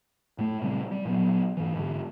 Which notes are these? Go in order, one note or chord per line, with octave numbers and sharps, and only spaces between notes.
A2 A3
A#2 C#3 G3 C4
G3
A#2 F#3 B3
G#2 E3
G#2 D3